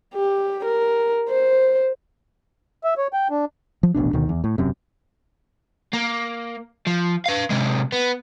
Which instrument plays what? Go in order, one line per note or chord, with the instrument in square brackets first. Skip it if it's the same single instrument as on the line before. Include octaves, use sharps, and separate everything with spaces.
[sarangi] G4
A#4
C5
[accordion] E5
C#5
G5
D4
[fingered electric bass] F3
D#1 A1 B2 D4
D2 B2 D#3
E2
A2
E1 F#2 C3
[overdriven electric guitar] A#3
F3
B4 F5
C3 G#3
B3